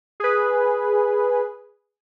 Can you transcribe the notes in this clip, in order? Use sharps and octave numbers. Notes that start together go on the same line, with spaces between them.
G#4 B4